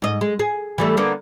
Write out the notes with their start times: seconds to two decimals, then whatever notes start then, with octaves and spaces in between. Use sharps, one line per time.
0.02 G#2 D#5
0.21 G#3
0.39 G#4
0.78 E3 G3 A3
0.97 D3 A#3 B3